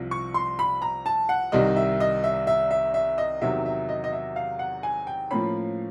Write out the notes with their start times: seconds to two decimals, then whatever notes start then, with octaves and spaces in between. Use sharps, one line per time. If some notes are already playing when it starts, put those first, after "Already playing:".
Already playing: C2 C3 F3
0.11 C#6
0.34 C6
0.59 B5
0.82 A#5
1.06 A5
1.29 F#5
1.52 C2 C3 D#3 G3 D#5
1.76 E5
2.00 D#5
2.24 E5
2.47 E5
2.71 E5
2.94 E5
3.18 D#5
3.42 E2 C3 D#3 F#3 E5
3.65 E5
3.89 D#5
4.04 D#5
4.13 E5
4.36 F5
4.59 F#5
4.83 G#5
5.07 G5
5.31 A2 F3 A#3 C#4 B5